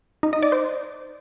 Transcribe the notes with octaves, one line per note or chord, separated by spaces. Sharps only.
D#4
D#5
D5
C5